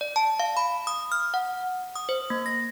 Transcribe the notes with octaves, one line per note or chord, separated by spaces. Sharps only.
D5
A5
F5
B5
D#6
F6
F#5
D#6
C5
A#3
A#6